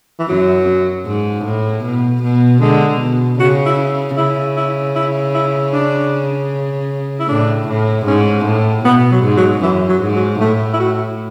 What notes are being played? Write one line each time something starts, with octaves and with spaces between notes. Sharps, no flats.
E3
F#2 F#3
G#2
A2
B2
B2
D3 G#3
B2
C#3 F#4
E4
C#3 E4
E4
E4
E4
D4
E4
A2 D4
A2
G#2 C#4
A2
B2 B3
F#3
G#2
F#3
F#2 E3
F#3
G#2
F#3
A2 A3
E4
F#4